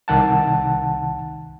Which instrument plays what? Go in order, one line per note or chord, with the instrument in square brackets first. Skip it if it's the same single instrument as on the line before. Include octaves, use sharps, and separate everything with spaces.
[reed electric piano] C2 D#3 F#5 A5